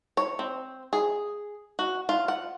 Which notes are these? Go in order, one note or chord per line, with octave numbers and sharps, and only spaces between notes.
C#5
C4
G#4
F#4
F4
F#5